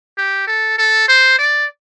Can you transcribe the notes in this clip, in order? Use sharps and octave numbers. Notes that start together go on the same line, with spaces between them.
G4
A4
A4
C5
D5